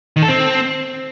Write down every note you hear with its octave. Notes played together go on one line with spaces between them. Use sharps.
D#3
A4
C4